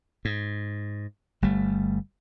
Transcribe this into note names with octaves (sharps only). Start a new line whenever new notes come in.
G#2
G1 G3 A3